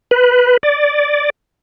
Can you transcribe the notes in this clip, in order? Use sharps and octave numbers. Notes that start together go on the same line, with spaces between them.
B4
D5